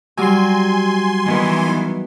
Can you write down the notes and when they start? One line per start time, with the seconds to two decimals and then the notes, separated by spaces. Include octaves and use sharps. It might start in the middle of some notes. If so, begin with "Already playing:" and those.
0.17 F#3 G3 G#5 C6
1.25 D#3 E3 B3